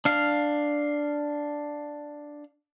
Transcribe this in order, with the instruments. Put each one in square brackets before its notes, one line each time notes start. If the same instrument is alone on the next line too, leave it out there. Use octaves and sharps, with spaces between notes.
[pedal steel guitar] D4 F5